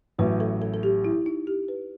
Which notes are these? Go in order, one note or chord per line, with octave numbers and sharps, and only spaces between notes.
A1 A2 F#3 B4
A4
A4
A4
G4
E4
D#4
G4
B4